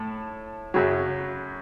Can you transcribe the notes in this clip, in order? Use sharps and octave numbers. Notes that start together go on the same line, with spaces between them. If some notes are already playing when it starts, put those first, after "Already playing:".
Already playing: A2 A4
F#2 C#3 F#3